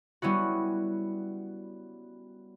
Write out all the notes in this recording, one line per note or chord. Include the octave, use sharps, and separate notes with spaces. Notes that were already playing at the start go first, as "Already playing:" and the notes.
G3 B3 C#4 E4 F#4